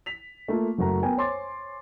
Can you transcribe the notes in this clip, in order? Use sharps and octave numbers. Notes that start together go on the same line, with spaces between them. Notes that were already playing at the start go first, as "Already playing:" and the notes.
B6 F7
A3 A#3 F4
F#1 F#3 A3 F#4 A#4 A#5
B3 A#4 G5 G#5
C5 C#5 G#5 C6 D6 A6